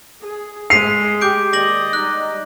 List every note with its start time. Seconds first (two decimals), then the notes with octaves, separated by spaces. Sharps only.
0.21 G#4
0.70 G#3 B6 C7 D#7 F7
1.21 G4 D6 G6 D7
1.53 D#2 D5 D#5 D6 A#6 F#7
1.93 G3 D#4 F#6